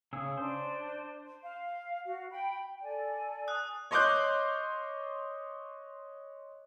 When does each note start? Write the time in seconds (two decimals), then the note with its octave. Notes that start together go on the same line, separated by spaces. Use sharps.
0.13 C#3 G#4 E6
0.38 D4 C5
1.43 F5
2.05 F#4 F5
2.31 G5 B5
2.82 A4 D5 G#5
3.48 D#6 F#6
3.91 C#5 D#5 C6 D6 F#6 G6